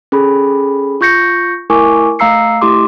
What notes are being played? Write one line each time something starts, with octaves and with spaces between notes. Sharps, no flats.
C#4 G#4 A4 B5
F4 C#6 G6 A#6 C#7
A3 E4 A#4 G#5 C#6 D6
A3 F5 A#5 E6 C7 C#7
A3 E4 G4 C6 D6